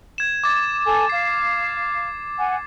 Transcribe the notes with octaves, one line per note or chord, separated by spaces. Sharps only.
G#6 E7
D6 A6
A4 G#5
F5 C7
F#5 G#5